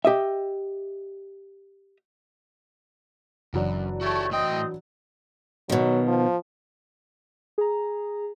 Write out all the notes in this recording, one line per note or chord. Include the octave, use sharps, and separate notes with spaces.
G4 D#5 E5
F#1 F#2 E3 F#3 D4
A3 F#4 G4 A4 C#5
A2 C4 D#5 G5
B2 D#3 F#3
F3
G#4 A#5